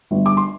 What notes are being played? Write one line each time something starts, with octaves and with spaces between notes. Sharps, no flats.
G1
D6
C6